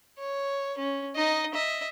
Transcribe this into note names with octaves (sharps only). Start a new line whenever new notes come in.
C#5
C#4
D#4 D#5
D#5 E5